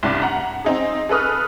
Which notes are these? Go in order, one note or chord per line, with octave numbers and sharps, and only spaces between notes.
C2 G2 D4
F#5 A#5
C4 D#4 G#4
G#4 A4 B4 D#6 F6